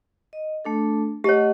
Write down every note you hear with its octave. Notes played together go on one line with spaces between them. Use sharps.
D#5
A3 D4 A4
A3 G4 C#5 D#5 F#5